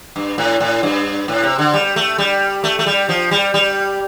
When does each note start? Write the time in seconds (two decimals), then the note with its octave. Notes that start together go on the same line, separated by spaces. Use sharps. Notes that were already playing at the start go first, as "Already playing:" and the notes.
0.16 G2
0.38 A2
0.60 A2
0.83 G2
1.28 A2
1.43 C3
1.58 D3
1.73 G3
1.96 A3
2.18 G3
2.64 A3
2.79 A3
2.86 G3
3.09 F3
3.31 G3
3.54 G3